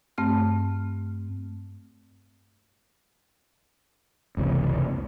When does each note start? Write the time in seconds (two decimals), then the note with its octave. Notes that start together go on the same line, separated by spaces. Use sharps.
0.18 G2 A3 C4 F6
4.37 F#1 C#2 C3 E3